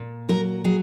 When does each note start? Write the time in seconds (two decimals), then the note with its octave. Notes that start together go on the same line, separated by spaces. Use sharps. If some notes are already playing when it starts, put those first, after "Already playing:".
Already playing: A#2
0.29 F#3 A#4
0.64 F#3 G#4